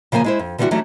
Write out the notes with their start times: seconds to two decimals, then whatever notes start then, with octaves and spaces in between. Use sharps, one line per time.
0.12 C#3 F3 A#3 G5 G#5
0.24 G#3 E4 C5
0.39 F2
0.58 D3 E3 G3 C#4 E4 F#4
0.71 E3 F#3 G3 A3 C#4 D#4